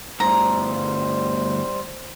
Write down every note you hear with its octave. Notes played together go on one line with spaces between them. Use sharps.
D2 G2 G3 C5 A#5